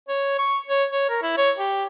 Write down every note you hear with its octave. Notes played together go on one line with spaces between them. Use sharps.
C#5
C#6
C#5
C#5
A#4
E4
C#5
G4